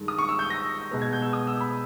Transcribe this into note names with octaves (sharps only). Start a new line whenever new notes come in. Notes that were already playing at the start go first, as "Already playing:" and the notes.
Already playing: G2 D#3 G#3
D#6
C#6
E6
G6
A#6
B2 G#3 B3
G#6
G6
E6
D#6
E6
B5